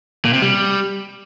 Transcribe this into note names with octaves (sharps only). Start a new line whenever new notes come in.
A#2
C3
G3